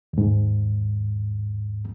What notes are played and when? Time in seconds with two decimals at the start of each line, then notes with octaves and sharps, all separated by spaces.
0.13 D#2 G#2